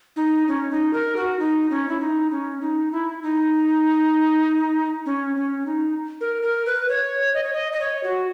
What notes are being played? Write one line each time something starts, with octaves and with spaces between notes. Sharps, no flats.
D#4
C#4
D#4
A#4
F#4
D#4
C#4
E4
D#4
C#4
D#4
E4
D#4
C#4
C#4
D#4
A#4
A#4
B4
C#5
D#5
C#5
D#5
D#5
C#5
F#4